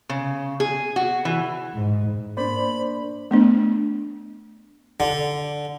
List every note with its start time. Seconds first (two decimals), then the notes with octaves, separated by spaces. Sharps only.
0.09 C#3
0.60 G#4
0.96 F#4
1.25 E3
1.75 G#2
2.37 A#3 D4 C5 D5 B5
3.31 A3 B3 D4
5.00 D3